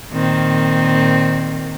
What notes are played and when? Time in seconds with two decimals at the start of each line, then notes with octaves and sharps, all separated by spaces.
0.11 A#2 D#3 C4